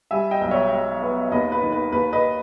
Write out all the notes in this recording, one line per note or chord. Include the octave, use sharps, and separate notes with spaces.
G3 E5 G#5
D#5 G5
B1
C#5 E5
G#3
B3
D#2 B4 D#5
B4
D#3
B4
D#2 B4
B4 D#5